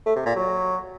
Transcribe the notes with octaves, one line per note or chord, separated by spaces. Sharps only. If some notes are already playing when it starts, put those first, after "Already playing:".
A3
C3
A#2
F#3